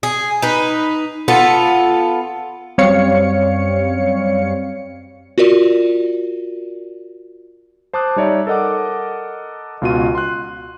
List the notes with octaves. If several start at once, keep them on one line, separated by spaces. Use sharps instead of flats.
G#4
D#4 B4
B3 F4 A4
F#2 G3 C4 C#5 F5 C#7
F4 F#4 A#4 D5
C5 A5 D6 D#6 F#6
G3 D#4 C#5 D5 E5
A4 A#4 D#5 F#5 D6
C#2 B2 F4 F#4 D#7
C6 F#6